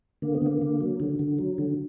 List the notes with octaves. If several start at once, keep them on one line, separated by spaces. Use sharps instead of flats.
D3 A#3
B3
D3 A#3
D3
F#3
D3
D3
F#3
D3